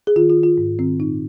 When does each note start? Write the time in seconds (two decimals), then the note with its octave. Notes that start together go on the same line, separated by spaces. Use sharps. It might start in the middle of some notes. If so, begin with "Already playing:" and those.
0.07 G#4
0.16 D#3 F4
0.29 F4
0.37 D#3
0.43 F4
0.58 G#2
0.79 D#3 C4
0.99 A#2 D#4